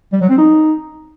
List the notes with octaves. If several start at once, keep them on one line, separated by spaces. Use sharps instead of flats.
G3
F#3
C4
D#4